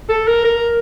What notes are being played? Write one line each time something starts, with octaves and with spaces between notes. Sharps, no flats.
A4
A#4
A#4